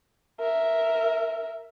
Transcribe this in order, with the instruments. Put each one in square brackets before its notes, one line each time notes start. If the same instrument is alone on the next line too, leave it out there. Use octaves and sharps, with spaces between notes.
[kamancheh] A#4 E5